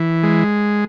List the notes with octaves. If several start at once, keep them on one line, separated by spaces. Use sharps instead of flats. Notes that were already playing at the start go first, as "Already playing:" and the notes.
Already playing: E3
G#3